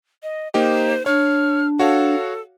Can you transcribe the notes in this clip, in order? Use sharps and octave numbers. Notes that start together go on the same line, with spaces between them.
D#5
A#3 D#4 G4 C5
D4 C#5 F6
F#4 A4 C#5 F5